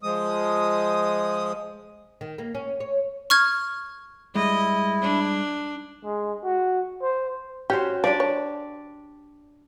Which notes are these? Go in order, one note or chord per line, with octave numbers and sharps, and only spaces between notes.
F3 G#3 D#6
D#3
A#3
C#4
C#5
C#6 F6 G#6
G2 G#3 E4 D#5
D4
G#3
F#4
C5
C#4 F#4 G4 C5
F3 D4 G4 D5
C#5